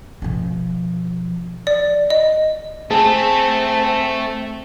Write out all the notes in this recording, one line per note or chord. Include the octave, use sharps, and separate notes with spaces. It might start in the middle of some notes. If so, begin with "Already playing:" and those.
B2 F3
D5
D#5
A3 C4 G#4 A4 A5